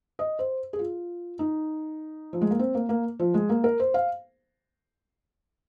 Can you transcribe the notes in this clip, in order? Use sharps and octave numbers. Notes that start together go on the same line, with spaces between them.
D#5
C5
G#4
F4
D#4
F3
G#3
A#3
C4
A#3
A#3
F3
G#3
A#3
A#4
C5
F5